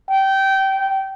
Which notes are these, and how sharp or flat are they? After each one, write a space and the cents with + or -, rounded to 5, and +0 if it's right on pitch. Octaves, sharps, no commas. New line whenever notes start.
G5 -20